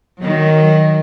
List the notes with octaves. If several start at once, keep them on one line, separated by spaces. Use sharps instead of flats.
D#3 F#3